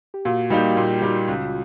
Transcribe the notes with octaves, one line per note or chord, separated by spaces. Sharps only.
G4
A#2 F#4
G3 A#3 D#4 F#4 G4
F#4
A#2 F4
G3 A#3 D#4 G4
C#2